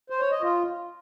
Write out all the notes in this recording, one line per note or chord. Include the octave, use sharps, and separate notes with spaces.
C5
C#5
D#5
F4